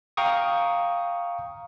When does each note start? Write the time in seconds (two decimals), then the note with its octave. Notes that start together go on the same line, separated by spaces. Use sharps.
0.17 F5 G5 A#5 C#6 D#6